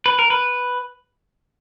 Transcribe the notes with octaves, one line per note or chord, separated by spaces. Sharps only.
B4
A#4
B4